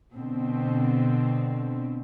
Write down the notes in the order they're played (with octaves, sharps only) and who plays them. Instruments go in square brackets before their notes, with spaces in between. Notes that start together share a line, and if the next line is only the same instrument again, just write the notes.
[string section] B2 D3 C4